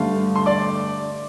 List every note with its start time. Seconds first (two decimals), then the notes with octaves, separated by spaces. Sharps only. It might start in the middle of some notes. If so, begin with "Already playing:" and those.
Already playing: G2 D3 A3 F5
0.36 C6
0.46 D5 D6